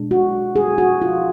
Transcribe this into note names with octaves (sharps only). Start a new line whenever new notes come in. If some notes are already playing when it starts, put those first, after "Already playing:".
Already playing: B2 G#3 D4
F#4
G#4
F#4
F4